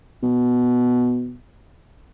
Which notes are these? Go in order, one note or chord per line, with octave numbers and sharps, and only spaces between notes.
B2